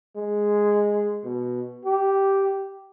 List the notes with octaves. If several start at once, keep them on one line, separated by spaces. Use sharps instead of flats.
G#3
B2
G4